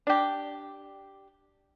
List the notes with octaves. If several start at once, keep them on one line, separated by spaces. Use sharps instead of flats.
D4 G4